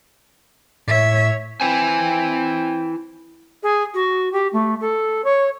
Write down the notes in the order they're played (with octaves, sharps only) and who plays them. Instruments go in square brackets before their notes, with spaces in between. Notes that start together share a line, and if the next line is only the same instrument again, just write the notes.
[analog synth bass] A2 [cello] C#5 E5
[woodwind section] C4 G5 [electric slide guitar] E4 B4 G#5
[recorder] G#4
F#4
G4
A3
A4
C#5